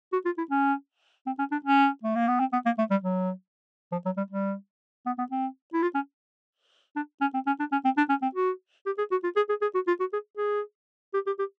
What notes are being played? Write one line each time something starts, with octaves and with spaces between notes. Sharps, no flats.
F#4
F4
E4
C#4
C4
C#4
D4
C#4
A3
A#3
B3
C4
B3
A#3
A3
G3
F#3
F3
F#3
G3
G3
B3
B3
C4
E4
F4
C#4
D4
C#4
C4
C#4
D4
C#4
C4
D4
C#4
C4
F#4
G4
G#4
F#4
F4
G#4
G#4
G#4
F#4
F4
F#4
G#4
G#4
G4
G4
G4